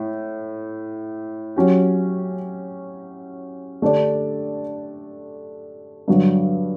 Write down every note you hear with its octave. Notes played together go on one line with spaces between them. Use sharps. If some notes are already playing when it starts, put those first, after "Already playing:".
Already playing: A2
F#3 C#4 G4
D3 A3 D4 G4 D5
G2 D3 F#3